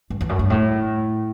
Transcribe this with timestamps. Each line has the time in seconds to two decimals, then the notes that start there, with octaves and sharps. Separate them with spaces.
0.10 G2
0.21 E2
0.29 F#2
0.39 G2
0.50 A2